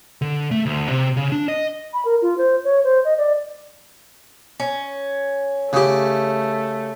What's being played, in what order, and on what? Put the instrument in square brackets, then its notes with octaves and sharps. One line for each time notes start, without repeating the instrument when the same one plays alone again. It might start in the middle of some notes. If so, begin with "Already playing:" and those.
[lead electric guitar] D3
A3
D2
C3
C#3
D4
D#5
[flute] B5
A#4
F4
C5
C#5
C5
D#5
D5
[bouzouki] C#4
[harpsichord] C#3 G4 [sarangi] A3